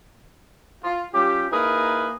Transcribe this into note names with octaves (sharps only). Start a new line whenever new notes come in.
F4
G3 C#4 F4 G4
A#3 D#4 E4 G#4 A#4 B4